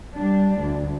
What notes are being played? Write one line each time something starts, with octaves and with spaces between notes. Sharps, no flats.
G3 D4
D2